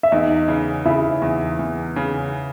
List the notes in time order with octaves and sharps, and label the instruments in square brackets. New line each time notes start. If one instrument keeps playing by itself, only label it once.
[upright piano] E5
[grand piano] E2 [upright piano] D#4 D#5
[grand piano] C#3
[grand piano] C#3 [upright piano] E4 E5
[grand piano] E2
E2
C#3